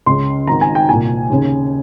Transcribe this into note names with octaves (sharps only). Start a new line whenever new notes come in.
C#2 C#3 C6
G#1 G#2 D#3 A#5
G#5
G5
C2 A#2 G#5
D#2 C#3